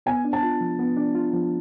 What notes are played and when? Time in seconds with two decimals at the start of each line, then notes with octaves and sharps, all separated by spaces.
0.06 B3 G#5
0.25 D4
0.33 A5
0.43 F4
0.61 F3
0.79 B3
0.97 D4
1.15 F4
1.33 F3